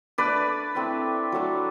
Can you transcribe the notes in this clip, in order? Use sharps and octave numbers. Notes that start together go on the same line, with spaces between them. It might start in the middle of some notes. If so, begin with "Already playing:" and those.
A3 D4 B4 D5
A3 C4 E4
F#3 A3 D4